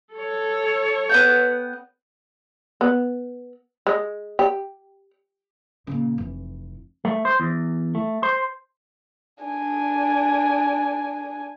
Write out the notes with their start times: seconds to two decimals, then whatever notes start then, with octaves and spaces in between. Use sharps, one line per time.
0.14 A4 C#5
1.09 B3 F#5 G5
2.81 B3
3.87 G#3
4.39 G4
5.87 A#2 C#3
6.18 F1 E3
7.05 A3
7.25 C5
7.40 E2
7.95 A3
8.23 C5
9.44 D4 G#5